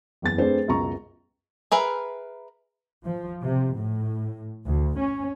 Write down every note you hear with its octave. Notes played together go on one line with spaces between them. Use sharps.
F#1 E2 A6
A3 C4 D4 G#4 B4 C5
C#2 F#2 B2 A#5 C#6
G#4 A#4 B4 E5
F3
C3
A2
D2
C#4